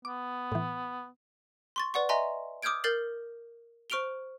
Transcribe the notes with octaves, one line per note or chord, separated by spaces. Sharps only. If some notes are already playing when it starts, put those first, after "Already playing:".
B3 D6
A2 E3
C6 C#6 A6
B4 D5 F#5 C#6
D#5 E5 G#5 A#5 C6
D6 D#6 F6 G6 G#6 D7
A#4 F6 G6 A6 C7 F#7
C5 C#6 F6 D7 F7 G7